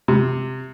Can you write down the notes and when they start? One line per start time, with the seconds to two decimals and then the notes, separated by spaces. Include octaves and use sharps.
0.08 C3